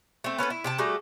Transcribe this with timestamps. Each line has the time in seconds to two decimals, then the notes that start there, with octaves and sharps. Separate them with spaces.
0.24 A3 C4
0.38 B3 C#4 A4 B4
0.50 E4
0.64 C3 G5 A5
0.78 G3 A3 F#4 G#4